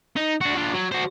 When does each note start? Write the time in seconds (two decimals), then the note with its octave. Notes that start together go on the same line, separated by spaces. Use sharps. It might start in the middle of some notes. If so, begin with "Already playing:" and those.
0.16 D#4
0.41 D4 F#4
0.56 D4 F4
0.74 F#3
0.92 F#4 C5